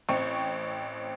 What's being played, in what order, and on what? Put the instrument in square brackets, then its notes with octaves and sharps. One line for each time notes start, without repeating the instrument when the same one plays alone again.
[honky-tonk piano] A1 C4 G5 C#6